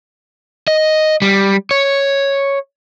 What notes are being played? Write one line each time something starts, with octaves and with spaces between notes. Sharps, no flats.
D#5
G3
C#5